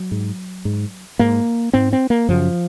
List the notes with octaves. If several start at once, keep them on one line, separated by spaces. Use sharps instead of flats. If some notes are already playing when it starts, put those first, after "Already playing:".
Already playing: F#3
G#2
G#2
G#2 A#3
G#2 C4
C4
A#3
F#2 C#3 F3